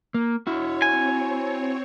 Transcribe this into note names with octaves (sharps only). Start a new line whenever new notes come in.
A#3
E4 F#4 C#5
C4 C#5 G#5